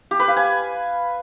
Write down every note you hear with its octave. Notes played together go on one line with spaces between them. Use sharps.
G4
B4
F5
G#5